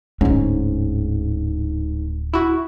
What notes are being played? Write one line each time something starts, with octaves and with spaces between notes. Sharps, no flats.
D1 G#2 C#4
E4 F#4